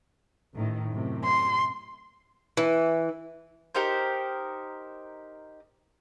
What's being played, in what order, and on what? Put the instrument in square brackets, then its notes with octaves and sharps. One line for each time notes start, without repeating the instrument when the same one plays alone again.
[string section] A1 A2 D#3
F#2 A2 C3
[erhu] C6
[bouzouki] E3
[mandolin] D#4 G4 A#4 C5